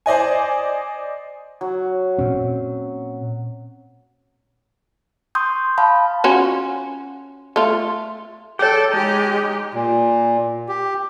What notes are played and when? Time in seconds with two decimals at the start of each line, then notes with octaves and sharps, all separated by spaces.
0.06 C5 D5 D#5 G#5
1.61 F#3
2.18 A#2 C4 C#4
5.35 C6 C#6 D#6 G6
5.78 F5 A5 B5
6.24 C#4 F4 F#4
7.56 A3 F4
8.59 G#4 A4 C#5 G5
8.91 G#3 D#4 G4
9.74 A#2
10.68 G4